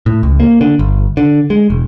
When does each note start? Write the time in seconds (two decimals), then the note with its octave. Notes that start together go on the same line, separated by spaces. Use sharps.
0.06 A2
0.23 C#2
0.40 A#3
0.61 D3
0.79 G1
1.17 D3
1.50 G#3
1.70 E1